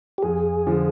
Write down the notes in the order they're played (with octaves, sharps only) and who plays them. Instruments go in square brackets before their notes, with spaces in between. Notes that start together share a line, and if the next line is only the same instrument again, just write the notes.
[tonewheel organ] G4
[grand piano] F2 [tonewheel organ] G#4
[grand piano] D3 F3